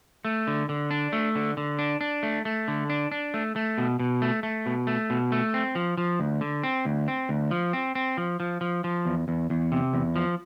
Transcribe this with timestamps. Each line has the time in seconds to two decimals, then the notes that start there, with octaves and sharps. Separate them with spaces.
0.25 A3
0.47 D3
0.69 D3
0.91 D4
1.13 A3
1.36 D3
1.57 D3
1.79 D4
2.01 D4
2.23 A3
2.45 A3
2.68 D3
2.90 D4
3.12 D4
3.34 A3
3.56 A3
3.78 B2
4.00 B2
4.22 A3
4.43 A3
4.66 B2
4.87 A3
5.10 B2
5.32 A3
5.54 C4
5.75 F3
5.98 F3
6.20 D2
6.41 D3
6.64 C4
6.85 D2
7.08 C4
7.29 D2
7.51 F3
7.73 C4
7.95 C4
8.18 F3
8.40 F3
8.61 F3
8.84 F3
9.05 E2
9.28 E2
9.50 E2
9.72 C3
9.93 E2
10.16 F3